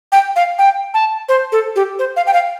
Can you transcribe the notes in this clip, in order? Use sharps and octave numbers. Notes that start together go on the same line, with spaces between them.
G5
F5
G5
A5
C5
A4
G4
C5
F5
G5
F5